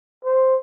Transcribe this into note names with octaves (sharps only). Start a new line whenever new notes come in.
C5